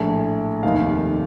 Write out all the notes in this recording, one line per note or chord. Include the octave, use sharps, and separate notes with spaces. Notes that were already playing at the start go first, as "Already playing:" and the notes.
Already playing: A#1 A2
F1 D#2 D#3 F5